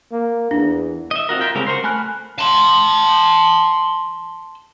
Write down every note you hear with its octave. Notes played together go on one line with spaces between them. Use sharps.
A#3
E2 D4
D#5 E5
C4 F4 F#4 A#4
F4 A#4 E5 G5
C#3 G3 G#3 C4 A#4
F#4 A#4 C5 C6
A3 G#5 B5 F6 F#6
A5 C6